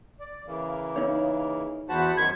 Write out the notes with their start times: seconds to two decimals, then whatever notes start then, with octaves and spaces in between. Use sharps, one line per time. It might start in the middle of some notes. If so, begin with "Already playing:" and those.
0.20 D5
0.46 C#3 E3 A#3
0.96 D#4 C#5
1.89 E2 F#4 C5 F#5 A5 B5
2.17 F#2 D#3 G#6